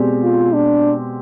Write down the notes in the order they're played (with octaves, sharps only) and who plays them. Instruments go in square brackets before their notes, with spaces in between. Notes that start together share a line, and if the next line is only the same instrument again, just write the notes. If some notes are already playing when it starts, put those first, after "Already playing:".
Already playing: [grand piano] B2 G#3 C4 G4 D5
[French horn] F4
D4